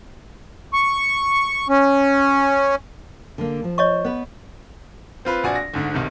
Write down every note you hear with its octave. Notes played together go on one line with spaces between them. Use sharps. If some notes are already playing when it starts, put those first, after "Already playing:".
C#6
C#4
D3 A#3
F3
C#5 D#5 C#6
B3 B4
C4 F4 B4
A#1 F#4 D5 G#5
A#6
D2 G#2 D3
B1 C3 D#3